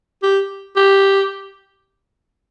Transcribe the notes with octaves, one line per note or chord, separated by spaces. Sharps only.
G4
G4